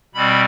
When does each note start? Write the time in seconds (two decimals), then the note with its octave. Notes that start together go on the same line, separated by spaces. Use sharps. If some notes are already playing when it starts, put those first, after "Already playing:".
0.14 B2 G3 C4 B5